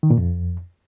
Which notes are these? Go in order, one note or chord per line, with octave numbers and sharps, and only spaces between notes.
D#3
A#2
F2